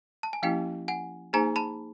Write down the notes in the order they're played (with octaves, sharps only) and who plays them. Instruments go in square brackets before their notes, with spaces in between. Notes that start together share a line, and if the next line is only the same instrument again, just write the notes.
[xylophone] A5
G#5
[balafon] F3 A#3 C#4 E4 G4 [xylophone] F5 G5
[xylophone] F#5 G#5
[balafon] A#3 D#4 G#4 C5 [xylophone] G#5 A#5
[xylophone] A5 B5